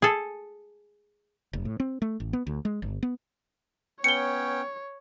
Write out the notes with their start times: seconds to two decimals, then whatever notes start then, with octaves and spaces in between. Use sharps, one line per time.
0.02 G#4 A4
1.53 F1
1.65 A2
1.80 C4
2.02 A3
2.20 A1
2.33 B3
2.47 D2
2.65 G#3
2.82 G1
3.03 B3
4.04 B3 C#4 C#5 G5 C#7 G7